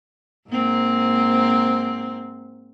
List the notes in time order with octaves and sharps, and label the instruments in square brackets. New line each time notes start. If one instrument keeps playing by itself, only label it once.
[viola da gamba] G#2 A#3 C4